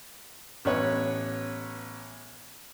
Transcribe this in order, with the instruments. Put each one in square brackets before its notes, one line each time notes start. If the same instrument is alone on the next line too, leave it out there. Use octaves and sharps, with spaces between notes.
[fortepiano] A1 B3 B4 C#5